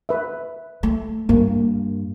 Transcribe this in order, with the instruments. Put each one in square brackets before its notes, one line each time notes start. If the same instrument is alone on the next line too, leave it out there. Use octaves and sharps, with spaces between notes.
[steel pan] B4 E5
[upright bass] A3
[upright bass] G2 [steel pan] A#3